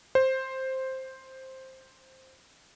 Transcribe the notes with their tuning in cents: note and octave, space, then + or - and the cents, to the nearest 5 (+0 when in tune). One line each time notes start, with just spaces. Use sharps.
C5 +5